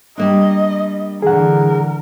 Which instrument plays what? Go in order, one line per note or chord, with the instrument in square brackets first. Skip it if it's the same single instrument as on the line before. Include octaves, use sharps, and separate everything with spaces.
[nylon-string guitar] G3 A#3 D4 [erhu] D#5
[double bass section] D3 E3 [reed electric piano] G#4 F#5 [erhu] A#4